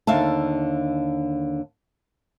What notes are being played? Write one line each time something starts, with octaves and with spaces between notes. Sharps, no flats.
D#2 D3 E5 F5 A5